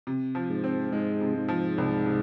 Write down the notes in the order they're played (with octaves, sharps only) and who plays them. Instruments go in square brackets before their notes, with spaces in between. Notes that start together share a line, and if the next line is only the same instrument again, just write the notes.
[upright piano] C3
F3
[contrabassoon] G#2
[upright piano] C4
[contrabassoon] G#2 [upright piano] G#3
[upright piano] C3
[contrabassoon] G#2
[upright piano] F3
C2
C3